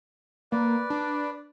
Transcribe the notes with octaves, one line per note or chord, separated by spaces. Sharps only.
A#3 B4 D5
D4